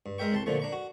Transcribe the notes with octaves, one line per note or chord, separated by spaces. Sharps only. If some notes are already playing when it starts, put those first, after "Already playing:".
G2
G#3 A#4 E5 G5 C#6
C2 A5 C6
A#2 D3 F3 A3 C#6
D4 A#5 C#6
F#4